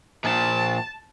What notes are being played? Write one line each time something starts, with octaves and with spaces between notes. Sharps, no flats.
A#2 F3 A5